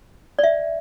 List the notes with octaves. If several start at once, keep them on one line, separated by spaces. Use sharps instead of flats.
D5
E5